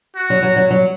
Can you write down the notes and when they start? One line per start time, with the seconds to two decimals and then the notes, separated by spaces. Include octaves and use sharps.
0.16 F#4
0.30 F#3
0.43 F#3
0.56 F#3
0.71 F#3